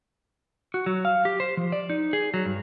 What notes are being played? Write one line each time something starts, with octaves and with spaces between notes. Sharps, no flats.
F#4
F#3
F5
G4
C5
F3
D5
D#4
G#4
F#3
G2